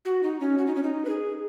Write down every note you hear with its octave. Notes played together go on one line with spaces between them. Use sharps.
F#4
D#4
C#4
F#4
D#4
C#4
D#4
B4
G#4